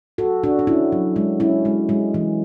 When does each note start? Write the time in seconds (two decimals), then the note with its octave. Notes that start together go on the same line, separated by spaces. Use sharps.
0.18 F#4 A4
0.44 D4 F#4
0.59 D4
0.67 C#4 E4
0.92 F#3
1.16 G#3
1.40 C#4 E4
1.65 G#3
1.89 G#3
2.14 E3